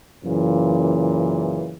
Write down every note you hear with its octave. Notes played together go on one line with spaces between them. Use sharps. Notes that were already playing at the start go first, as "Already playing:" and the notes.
F#2 A#2 C#3 E3